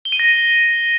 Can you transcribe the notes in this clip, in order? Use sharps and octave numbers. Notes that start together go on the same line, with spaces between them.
G7
D#7
A#6